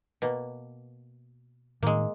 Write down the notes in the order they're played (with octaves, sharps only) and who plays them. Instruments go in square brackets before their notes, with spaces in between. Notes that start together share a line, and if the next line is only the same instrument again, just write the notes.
[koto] B2 A#3
[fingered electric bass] A2 D#3 [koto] G#3 A#3